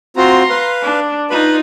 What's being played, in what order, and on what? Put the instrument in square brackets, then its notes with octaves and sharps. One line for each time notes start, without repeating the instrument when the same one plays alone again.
[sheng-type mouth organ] C4 F4 F#4 [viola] A#5 C6
[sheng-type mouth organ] B4 F5
[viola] D4
[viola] D#4 F4 [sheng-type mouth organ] B4 B5